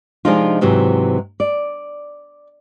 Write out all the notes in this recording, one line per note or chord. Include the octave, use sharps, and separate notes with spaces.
C3 F3 G#3 D4 D#4 F4
G#2 C3 E3 F#3
D5